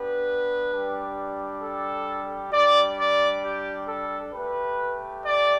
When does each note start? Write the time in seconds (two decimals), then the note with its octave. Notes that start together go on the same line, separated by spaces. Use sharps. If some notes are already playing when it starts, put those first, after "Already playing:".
Already playing: B3 D4 G4 B4
0.72 G3 D4 G4
1.62 A4
2.52 G3 D4 G4 D5
2.97 D5
3.43 G4
3.87 A4
4.33 A3 G4 B4
5.23 D5